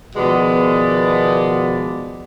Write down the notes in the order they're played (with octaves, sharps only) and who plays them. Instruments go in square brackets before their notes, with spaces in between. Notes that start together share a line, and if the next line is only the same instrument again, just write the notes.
[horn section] B2 D#3 F3 G#3 B3 D5